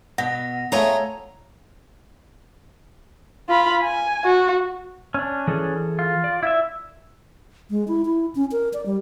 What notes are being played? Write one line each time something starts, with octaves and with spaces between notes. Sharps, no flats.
B2 F#5 A#6
A3 F4 G#4 C#5 A#5
F4 B5
G#5
F#4
C#4 D4
E3 G#4 A4
F4
D5
E4 E5
G#3
E4
E4
C#4
A#4
D5
G3